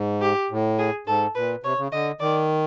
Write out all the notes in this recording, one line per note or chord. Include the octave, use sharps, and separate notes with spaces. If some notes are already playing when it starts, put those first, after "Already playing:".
Already playing: G#2
G4
A2
G#4
G#2 A4
A#2 B4
C3 C#5
C#3
D3 D#5
D#3 D5